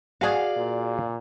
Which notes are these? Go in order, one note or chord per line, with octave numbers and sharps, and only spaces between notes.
F#4 G#4 D5 F5
A#2